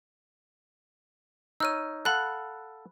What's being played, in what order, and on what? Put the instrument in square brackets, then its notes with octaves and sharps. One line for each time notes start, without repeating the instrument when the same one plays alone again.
[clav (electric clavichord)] D#4 C#5 [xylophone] E6 F6 D#7
[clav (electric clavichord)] A4 F5 F#5 [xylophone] B5 F#6